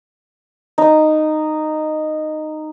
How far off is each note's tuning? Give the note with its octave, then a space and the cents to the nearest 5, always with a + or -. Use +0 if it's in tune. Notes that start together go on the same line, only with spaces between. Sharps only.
D#4 -10